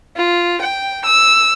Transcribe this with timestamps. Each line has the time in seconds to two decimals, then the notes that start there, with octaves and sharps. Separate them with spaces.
0.17 F4
0.62 G5
1.05 E6